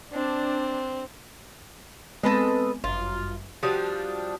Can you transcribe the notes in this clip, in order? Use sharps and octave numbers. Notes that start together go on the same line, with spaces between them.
C4 D4
G#3 B3 C4 A4 B4 D#5
G1 F#2 F4
F3 G3 D4 F#4 G4 D#6